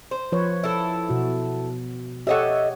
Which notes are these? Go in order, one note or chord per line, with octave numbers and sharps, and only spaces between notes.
C5
F3 B4 C#5
E4 A4
B2 F#4
G4 A4 C#5 D#5 E5 F#5